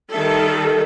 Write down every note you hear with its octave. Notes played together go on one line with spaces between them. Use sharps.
D#3 G3 A4 E5